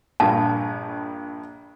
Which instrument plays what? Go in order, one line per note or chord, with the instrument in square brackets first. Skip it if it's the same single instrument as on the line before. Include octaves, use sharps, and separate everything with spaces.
[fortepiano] A#1 G2 [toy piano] A5